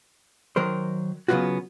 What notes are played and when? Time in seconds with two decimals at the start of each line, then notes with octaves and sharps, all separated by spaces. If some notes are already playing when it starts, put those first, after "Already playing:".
0.56 D#3 F#3 A#4 C5
1.28 C#3 F#3 B3 C#4 F4 F#4